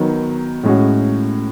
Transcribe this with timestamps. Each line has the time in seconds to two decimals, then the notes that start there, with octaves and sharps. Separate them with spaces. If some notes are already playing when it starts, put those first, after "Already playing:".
Already playing: D#3 F#3 B3
0.63 A2 G#3 C#4 F#4